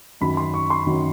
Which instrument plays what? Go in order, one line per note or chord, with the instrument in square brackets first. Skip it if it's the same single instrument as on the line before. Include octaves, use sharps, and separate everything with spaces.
[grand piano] F#2 D#3 F#3 B5
C6
C#6
C6
F#2 D#3 F#3